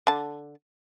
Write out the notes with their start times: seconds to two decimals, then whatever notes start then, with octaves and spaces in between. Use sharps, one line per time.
0.07 D3 A5